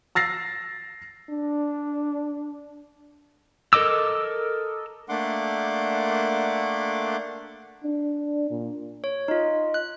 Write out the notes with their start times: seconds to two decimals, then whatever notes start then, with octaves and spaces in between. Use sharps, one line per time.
0.15 E6 A6 A#6 C7
1.30 D4
3.73 A4 A#4 D#5 D6 E6
5.09 A3 A#3 D4 F#5 C6 D6
7.83 D4
8.50 A#2
9.04 C#5
9.28 D#4 F4 D#5
9.74 F#6